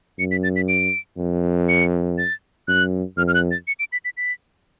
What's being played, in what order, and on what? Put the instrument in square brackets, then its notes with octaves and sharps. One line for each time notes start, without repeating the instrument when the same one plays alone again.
[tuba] F#2 [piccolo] C#7
[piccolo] B6
A6
B6
D7
[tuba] F2
[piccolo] C#7
A6
[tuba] F#2 [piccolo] F#6
[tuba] F2 [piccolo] F6
[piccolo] F6
F#6
A6
C#7
D7
B6
B6
B6